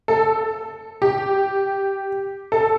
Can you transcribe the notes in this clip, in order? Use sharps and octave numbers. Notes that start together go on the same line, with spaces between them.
A4
G4
A4